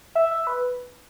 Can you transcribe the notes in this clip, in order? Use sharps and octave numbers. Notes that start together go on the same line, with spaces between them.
E5
E5
B4